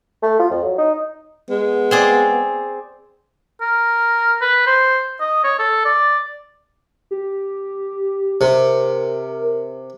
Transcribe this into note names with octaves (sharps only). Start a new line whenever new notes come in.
A3
F4
F2
F#3
D#4
G#3 B3
C4 G#4 D5
A#4
B4
C5
D#5
C#5
A4
D5
G4
C3 A#4